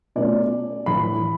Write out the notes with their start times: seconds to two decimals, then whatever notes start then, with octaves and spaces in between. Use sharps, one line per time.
0.16 B2 A3 C#4 D5
0.86 A2 E3 A3 B5